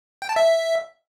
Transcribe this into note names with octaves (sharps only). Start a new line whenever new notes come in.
G5
A5
E5